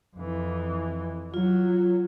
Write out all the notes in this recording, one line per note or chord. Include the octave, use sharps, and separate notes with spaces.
F2 E3
F#3 F4